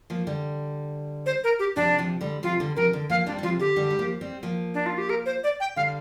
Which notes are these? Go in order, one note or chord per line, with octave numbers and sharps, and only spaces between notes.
F3 A#3
D3 G3
C5
A#4
G4
C3 F3 D4
C3 F3
D3 G3
C3 F3 F4
D3 G3
C3 F3 A#4
D3
F3 A#3 F5
G3 C4 D4
G3
C3 F3 F4
D3 G4
D3 G3
G3
F3 A#3
G3 C4
F3 A#3
D4
F4
G4
A#4
C5
D5
G5
D3 G3 F5